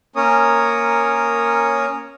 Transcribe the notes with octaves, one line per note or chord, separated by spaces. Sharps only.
A#3 C#4 A#4 C#5 D#6